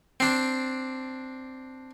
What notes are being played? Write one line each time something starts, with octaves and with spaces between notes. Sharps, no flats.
C4 D4